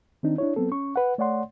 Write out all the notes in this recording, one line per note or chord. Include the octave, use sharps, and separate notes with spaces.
D#3 C4 D4 D#4
D4 E4 C#5
F#3 B3 C4 A4
C#4 C#6
B4 F#5
A3 C#5 D5 F#5 C6